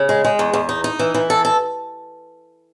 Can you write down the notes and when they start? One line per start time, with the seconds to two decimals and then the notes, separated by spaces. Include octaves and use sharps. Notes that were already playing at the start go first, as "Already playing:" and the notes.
Already playing: C#3
0.09 G#3
0.24 G#3
0.39 E2
0.53 E2
0.69 D#4
0.84 D#4
0.99 E3
1.14 E3
1.30 A4
1.45 A4